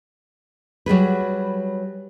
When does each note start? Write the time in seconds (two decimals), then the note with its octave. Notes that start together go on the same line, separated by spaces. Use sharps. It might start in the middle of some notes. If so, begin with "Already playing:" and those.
0.86 F#3 G3 G#4 B4